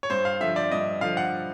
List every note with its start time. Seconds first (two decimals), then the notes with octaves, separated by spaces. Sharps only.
0.03 C#5
0.10 G2 C5
0.25 F5
0.41 D3 F3 E5
0.56 D5
0.72 G2 D#5
1.01 D3 F3 F5
1.17 F#5